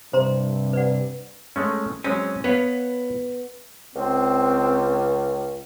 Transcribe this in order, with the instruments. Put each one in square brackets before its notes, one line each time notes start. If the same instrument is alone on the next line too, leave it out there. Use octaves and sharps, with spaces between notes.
[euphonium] G2 [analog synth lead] C3 [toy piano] C5 A#5 C6
[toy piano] B4 D5 F#5
[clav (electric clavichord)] G#3 A3 C#4
[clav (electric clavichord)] F#3 G#3 C4 [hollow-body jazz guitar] C#4
[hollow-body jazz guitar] B3 [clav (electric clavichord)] B4 C#5 F5
[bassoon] C#2 [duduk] C4